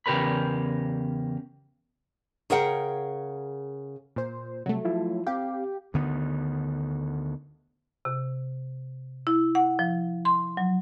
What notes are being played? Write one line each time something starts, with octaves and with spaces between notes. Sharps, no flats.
E2 C#3 G4 A#4 B4 B5
C#3 G#4 A#4 F#5 G5
A#2 C5
C3 F#3 G3 A3
F3 E4 F4
C4 G4 F5
D2 D3 D#3 B3
C3
E4
F#5
F3
C6
F#3